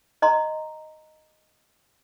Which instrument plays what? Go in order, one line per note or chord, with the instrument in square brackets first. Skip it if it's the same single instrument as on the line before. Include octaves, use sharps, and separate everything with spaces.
[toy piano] D#5 A#5 C6